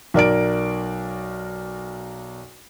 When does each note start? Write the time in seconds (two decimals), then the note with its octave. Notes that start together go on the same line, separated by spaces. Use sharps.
0.14 B1 A#4 D5 D7